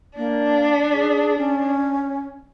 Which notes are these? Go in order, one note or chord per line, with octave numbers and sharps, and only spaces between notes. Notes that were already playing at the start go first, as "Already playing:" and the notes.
A#3 D4
G#4
C#4